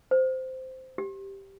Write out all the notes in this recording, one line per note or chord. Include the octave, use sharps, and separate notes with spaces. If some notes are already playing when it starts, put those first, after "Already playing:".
C5
G4